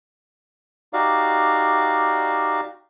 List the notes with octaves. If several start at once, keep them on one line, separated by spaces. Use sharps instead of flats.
D#4 F#4 G4 D5 F5